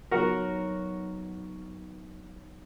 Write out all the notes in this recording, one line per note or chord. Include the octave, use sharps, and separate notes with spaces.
F#3 B3 D#4 F#4 A#4